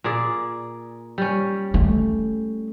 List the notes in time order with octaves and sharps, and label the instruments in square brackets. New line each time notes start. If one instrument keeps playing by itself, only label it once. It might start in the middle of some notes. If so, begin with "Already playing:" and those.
[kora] A#2 G#4 D5
G3 C#4
[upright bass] A3